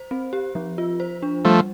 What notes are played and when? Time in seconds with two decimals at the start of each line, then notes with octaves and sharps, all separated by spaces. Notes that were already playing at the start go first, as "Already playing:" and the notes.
Already playing: C5
0.11 C4
0.33 G4
0.55 F3
0.78 F4
1.00 C5
1.23 D4
1.45 F3 G3 A3